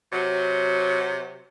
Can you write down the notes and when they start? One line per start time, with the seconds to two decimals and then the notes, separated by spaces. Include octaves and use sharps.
0.12 C3 F#3